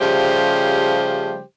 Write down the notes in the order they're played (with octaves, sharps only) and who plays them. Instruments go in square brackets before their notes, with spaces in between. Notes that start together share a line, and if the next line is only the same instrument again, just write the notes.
[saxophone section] C#3 F3 G3 A3 G4 C5